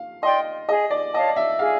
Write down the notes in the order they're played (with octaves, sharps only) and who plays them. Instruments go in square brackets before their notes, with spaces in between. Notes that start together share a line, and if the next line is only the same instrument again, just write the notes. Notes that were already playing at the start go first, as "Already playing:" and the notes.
Already playing: [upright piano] F5
[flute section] D5 G5 C6 [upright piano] D#5
[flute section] G#4 [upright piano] D#5
[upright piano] D5
[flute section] C#5 F5 A5 [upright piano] D#5
[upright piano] E5
[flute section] G#4 [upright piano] F5